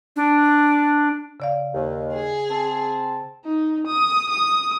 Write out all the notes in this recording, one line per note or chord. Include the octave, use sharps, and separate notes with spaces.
D4
C#3 D5 F5
D#2
G#4
C4 A5
D#4
D#6
D#6